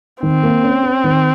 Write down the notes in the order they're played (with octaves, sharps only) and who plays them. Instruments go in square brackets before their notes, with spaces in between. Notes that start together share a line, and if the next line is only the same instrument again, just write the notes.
[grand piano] D#3 [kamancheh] C4
[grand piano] A#3
C#4
C#4
D#3